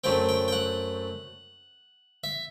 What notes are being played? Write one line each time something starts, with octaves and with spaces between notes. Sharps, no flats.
F#2 F#3 A3 C4 G5
G5
G5
F#5
E5